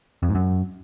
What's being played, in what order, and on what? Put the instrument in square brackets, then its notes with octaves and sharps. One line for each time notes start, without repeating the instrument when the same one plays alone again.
[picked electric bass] F2
G#2
F#2